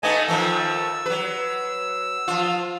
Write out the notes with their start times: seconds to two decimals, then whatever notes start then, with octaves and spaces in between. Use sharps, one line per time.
0.03 A3 B3 D#4 D#5 G#5 A5
0.28 D#3 F3 A3 E6
1.06 F#3 B4
2.28 F3 F4